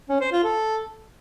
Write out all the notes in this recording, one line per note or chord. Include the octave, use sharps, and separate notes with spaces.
C#4
C5
F4
A4